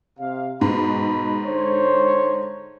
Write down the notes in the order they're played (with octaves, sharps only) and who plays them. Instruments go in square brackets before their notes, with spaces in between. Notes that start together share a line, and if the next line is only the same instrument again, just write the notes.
[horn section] C3 F5
[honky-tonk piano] G#2 [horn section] B2 B5
[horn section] D3 C5 C#5